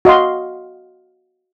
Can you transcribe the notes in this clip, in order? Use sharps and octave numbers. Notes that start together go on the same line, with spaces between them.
F#4 D#5 F5 C6